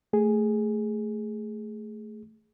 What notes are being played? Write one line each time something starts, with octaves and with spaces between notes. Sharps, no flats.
A3 G#4